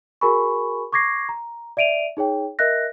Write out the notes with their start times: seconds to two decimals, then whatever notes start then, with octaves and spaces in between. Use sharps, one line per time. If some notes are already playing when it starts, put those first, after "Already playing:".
0.21 F#4 G#4 A#4 G#5 B5 C#6
0.92 C#6 D6 G#6 A#6 C7
1.29 A#5
1.77 D5 E5 D7 D#7 F7
2.17 D#4 G#4 C#5 G5
2.59 A#4 D#5 E5 F#6 A#6